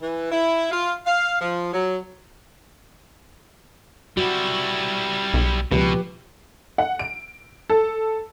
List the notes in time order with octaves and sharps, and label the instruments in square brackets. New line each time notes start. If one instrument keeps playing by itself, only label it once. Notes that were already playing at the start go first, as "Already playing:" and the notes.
[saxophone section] E3
E4
F4
F5
F3
F#3
[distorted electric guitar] G3 E4 [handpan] F#4
[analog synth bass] B1
[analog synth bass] C#2 [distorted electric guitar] B2 [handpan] F3 G4 B4
[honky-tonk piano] F#5
D7
A4